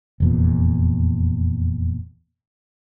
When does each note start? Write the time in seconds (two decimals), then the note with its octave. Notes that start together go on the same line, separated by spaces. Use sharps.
0.20 F1 E2 A#2